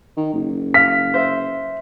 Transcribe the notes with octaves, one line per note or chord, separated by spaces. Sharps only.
D#3
F#1
F5 B6
C5 E5